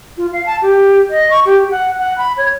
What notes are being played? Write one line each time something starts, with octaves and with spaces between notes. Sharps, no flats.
F4
F5
A5
G4
D#5
C#6
G4
F#5
F#5
B5
C#5